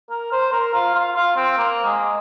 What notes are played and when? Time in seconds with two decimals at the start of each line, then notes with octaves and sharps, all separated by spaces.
0.10 A#4
0.32 C5
0.52 A#4
0.74 F4
0.95 F4
1.16 F4
1.37 C4
1.58 A#3
1.86 G#3